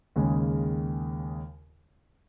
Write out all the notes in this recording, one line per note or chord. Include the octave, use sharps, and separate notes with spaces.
D#2 C#3 G#3